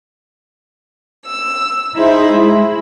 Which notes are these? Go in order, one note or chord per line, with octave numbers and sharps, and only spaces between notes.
E6
D#4 E4 G#4 C5 E5
G#3 E4